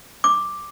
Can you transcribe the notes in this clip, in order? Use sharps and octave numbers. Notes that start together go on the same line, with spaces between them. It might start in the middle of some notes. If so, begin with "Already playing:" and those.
D6